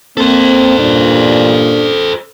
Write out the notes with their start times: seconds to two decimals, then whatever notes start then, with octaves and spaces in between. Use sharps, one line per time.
0.17 A#3 C4 A4 C5
0.77 G2 A#2 D4